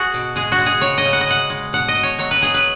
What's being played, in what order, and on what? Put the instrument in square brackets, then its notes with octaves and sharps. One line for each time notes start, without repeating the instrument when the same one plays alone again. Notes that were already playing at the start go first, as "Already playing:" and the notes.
Already playing: [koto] F#4 G#4
B2
G#3 G#4
F#4
G#3
G#4
C#3 C#5
D#5
C#3
F#5
D#5
G#3 F#5
G#3
B2 F#5
D#5
B2
C#5
F#3 C#5
B4
F#3 G#4
B4